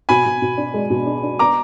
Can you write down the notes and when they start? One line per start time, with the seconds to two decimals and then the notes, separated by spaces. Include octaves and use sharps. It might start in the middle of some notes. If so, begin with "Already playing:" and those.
0.09 B2 G#5 B5
0.25 B2
0.42 B2
0.58 D4
0.74 G#3
0.90 B2
1.06 D4
1.23 D4
1.39 B3 A#5 D6